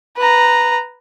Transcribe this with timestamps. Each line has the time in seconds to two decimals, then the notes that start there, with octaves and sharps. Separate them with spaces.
0.17 B4 A#5